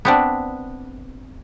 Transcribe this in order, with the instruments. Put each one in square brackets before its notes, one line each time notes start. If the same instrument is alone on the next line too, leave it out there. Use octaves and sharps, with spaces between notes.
[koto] B3 C4 D4